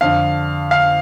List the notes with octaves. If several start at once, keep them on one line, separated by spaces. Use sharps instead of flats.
F2 D3 F5
F5